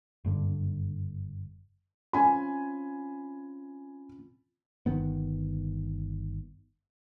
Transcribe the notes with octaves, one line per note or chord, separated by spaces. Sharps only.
F#1 G2 D3
C4 C#4 F4 G#5 B5
G1 D#3 B3